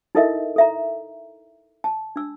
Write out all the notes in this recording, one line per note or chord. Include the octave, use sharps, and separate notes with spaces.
D#4 E4 A4 A#4 D#5 E5
A4 E5 A#5
A5
D4 E6